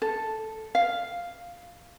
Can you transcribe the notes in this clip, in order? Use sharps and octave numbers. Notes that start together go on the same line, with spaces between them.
A4
F5